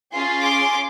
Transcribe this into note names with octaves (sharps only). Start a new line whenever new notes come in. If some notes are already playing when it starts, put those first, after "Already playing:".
C#4 F4 G#4
C6 D6